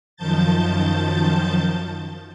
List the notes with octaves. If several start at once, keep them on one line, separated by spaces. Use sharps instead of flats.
F#2 D#3 F3 A5 G6 A6